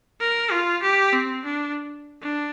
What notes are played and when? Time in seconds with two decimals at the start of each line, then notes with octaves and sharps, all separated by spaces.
0.20 A#4
0.51 F4
0.82 G4
1.13 C4
1.44 D4
2.22 D4